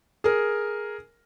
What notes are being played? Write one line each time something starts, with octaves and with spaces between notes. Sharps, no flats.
G#4 A#4